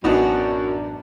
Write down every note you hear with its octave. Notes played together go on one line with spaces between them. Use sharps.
A1 F#2 B3 D4 D#4 F#4